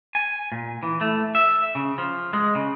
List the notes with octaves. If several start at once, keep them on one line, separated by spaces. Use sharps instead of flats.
G#5
A#2
E3
A3
E5
C#3
F3
G#3
C#3